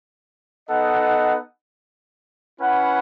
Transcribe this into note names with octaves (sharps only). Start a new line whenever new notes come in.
B3 D#4 A4 D#5 F#5
C#4 E4 B4 F#5